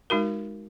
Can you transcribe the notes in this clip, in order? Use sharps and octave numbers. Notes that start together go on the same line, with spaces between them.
G#3 D#4 F#4 A#4